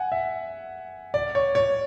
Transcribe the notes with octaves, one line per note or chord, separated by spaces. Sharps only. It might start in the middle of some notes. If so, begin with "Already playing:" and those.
Already playing: F#5 G#5
E5
D5
C#5
C#5